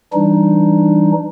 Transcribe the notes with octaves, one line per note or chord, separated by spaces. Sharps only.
E3 G3 D4 D#4